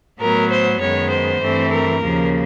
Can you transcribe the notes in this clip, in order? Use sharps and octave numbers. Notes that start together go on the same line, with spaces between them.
A2 F#3 B3 A#4
C5
F#2 D#3 G#3 B3 C#5
C5
G2 E3 A3 C4
A#4
D#2 C#3 F3 A#3